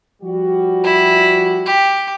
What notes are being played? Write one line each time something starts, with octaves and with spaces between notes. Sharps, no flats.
F3 G3 F#4
E4
G4